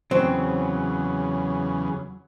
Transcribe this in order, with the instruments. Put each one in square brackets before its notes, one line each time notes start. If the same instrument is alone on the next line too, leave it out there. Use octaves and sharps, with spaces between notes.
[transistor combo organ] E2 C#3 [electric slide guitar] F#3 [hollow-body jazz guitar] C4